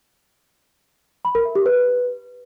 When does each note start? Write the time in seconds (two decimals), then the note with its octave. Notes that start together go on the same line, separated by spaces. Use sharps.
1.25 B5
1.35 A#4
1.45 E5
1.55 G4
1.66 B4